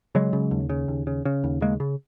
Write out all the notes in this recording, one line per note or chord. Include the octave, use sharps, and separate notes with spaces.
C#3 F#3 G#3
C#3
D#2
C#3
D#2
C#3
C#3
D#2
C#3 G#3 A#3
C#3